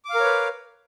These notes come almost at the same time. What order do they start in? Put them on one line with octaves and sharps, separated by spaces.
D6 F5 A#4 C#5 B4